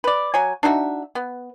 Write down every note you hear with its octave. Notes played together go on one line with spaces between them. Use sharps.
B4 D5
F#3 C#5 G#5
D4 D#4 F#4 E5
B3